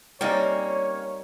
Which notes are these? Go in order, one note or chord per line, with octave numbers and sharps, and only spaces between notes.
G3 A#3 C4 C#4 D#4 C#5 D5